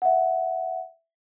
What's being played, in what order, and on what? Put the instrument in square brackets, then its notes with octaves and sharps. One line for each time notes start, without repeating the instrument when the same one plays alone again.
[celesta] E5 F#5